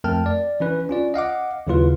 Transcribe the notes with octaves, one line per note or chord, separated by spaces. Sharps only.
F2 A3 A#4 G5 A5 F6
D5
E3 C#4 B4
C#4 F4 D5
D#5 F5 F#5 D6
D#2 C#3 F#3 E4 F4 B4